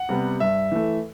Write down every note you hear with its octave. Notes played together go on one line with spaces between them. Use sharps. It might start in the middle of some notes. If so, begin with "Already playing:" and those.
Already playing: F#5
C3 G3 B3
G2 E5
E3 A3